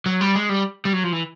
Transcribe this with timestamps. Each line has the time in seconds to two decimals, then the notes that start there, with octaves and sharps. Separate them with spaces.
0.06 F#3
0.21 G3
0.35 G#3
0.49 G3
0.85 G3
0.93 F#3
1.04 F3
1.12 E3